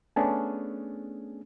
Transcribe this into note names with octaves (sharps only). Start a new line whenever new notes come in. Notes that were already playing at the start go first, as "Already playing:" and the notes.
A3 B3 C#4 D4 G#4